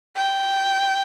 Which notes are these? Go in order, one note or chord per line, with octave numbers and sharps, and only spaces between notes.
G5